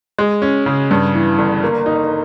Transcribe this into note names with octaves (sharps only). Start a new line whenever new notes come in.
G#3
C#4
C#3
G2
E3
G1
A#3
D#4